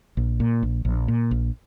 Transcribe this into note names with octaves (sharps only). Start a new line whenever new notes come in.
A#1
A#2
A#1
A#1
A#2
A#1